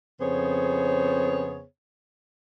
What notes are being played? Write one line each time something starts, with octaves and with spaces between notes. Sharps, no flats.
F2 C#3 B3 G#4 C5 C#5